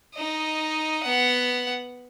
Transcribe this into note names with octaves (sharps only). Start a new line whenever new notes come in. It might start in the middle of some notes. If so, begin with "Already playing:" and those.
D#4 D#5
B3 F#5